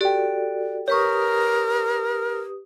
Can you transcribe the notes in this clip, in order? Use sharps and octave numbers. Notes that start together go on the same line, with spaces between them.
F#4 G4 A4 D5 G5
G4 A#4 B4 C#5 C#6 D#6